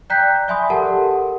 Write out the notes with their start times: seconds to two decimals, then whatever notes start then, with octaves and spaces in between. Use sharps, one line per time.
0.10 D5 G5 A#5 F#6 G6 B6
0.48 D5 E5 G#5 B5 C6 D#6
0.70 G4 A4 A#4 F#5 A5